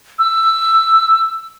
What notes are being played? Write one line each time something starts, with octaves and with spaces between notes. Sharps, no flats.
E6